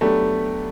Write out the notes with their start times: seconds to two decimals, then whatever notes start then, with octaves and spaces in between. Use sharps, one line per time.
0.01 F#3 A3 B3 D4 G4